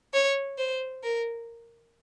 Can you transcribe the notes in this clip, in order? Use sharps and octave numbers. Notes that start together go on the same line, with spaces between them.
C#5
C5
A#4